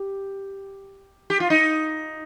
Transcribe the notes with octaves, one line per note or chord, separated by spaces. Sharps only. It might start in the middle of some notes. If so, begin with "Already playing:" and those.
Already playing: G4
G4
F4
D#4